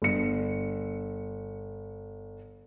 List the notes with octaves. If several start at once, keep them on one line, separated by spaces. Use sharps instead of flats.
G1 C#7